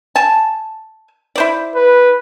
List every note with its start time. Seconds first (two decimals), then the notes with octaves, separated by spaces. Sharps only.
0.16 G#5 A5
1.36 E4 C5 D5
1.75 B4